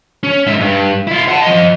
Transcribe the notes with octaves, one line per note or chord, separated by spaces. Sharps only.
C#4
G#2 E5
G2
E4 F4
F#5 A5
F3 D#5